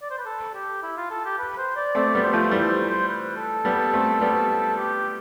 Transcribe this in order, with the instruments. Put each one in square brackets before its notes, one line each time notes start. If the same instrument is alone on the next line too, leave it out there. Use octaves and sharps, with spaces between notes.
[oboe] D5
C5
B4
A4
G4
E4
F4
A4
G4
B4
C5
D5
[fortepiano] A3 C4 [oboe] D5
[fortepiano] G3 B3
[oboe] C5
[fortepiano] F3 A3
[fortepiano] E3 G3 [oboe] C5
[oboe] C5
C5
B4
A4
[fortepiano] G3 B3
A3 C4
G3 B3
[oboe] G4